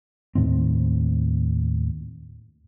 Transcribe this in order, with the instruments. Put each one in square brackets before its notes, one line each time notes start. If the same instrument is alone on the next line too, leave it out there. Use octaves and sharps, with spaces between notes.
[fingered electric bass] D#2 A2 D#3 C4